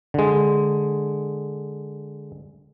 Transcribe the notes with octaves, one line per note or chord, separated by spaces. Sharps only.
D3 G#3